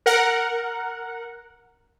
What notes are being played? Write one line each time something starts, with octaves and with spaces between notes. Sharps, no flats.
A#4 F#5